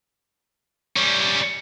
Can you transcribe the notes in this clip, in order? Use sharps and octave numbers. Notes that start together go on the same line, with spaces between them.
G3 C#4